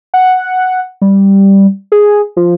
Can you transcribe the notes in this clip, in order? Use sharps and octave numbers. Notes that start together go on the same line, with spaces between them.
F#5
G3
G#4
F3